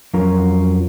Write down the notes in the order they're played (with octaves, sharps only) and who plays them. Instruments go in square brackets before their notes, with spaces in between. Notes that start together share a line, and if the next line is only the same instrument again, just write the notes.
[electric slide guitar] F2 F#3 C#4 F4 A#4